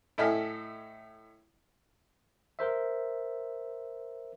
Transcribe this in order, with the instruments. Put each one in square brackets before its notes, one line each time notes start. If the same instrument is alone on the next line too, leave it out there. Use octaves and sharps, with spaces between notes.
[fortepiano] A2 A4 D#5 E5 G#5 F6
[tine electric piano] A#4 C5 E5